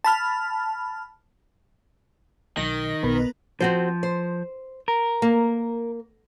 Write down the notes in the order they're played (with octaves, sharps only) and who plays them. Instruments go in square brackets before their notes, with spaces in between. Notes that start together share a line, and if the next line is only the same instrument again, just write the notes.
[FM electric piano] A5 B5 F6
[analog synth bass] B1 [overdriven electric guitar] D#3 [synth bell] A#6
[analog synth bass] B1 [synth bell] B3 A#4 B4
[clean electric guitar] F3 [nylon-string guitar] C4 F#4 C5
[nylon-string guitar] C5
[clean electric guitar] A#4
[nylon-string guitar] A#3